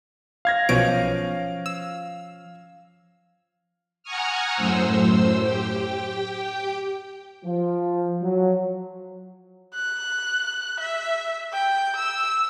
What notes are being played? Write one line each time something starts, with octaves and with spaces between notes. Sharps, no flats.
F5 G#6 A#6
B1 B2 F3 C#4 D7
E6
F#5 G#5 A#5 C#6 D#6 F6
F#2 A2 C5 E6
G4 G5
F3
F#3
F#6
E5
G5
E6